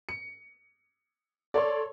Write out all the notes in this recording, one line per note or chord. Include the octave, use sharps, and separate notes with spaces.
C#7
A4 C#5 D5 C6